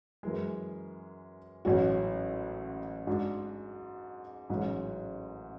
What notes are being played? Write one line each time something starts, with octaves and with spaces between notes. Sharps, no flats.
F#2 E3 G#3
A1 G#2 F#3 C#4 F#4
G#2 G#3 D4 F#4
A1 G#2 F#3 C#4 F#4